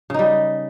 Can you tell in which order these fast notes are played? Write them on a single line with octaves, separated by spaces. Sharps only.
C#3 D#4 G3